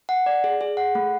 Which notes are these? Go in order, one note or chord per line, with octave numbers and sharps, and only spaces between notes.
F#5
D5
G#4
G#4
F#5
A3